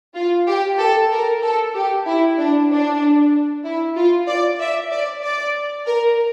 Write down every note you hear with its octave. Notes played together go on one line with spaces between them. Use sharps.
F4
G4
A4
A#4
A4
G4
E4
D4
D4
E4
F4
D5
E5
D5
D5
A#4